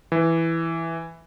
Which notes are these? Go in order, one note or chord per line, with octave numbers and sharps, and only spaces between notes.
E3